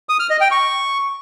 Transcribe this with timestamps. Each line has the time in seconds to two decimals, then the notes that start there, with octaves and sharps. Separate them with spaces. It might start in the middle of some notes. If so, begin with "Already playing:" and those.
0.09 D#6
0.20 F6
0.30 D#5
0.41 G5
0.51 C#6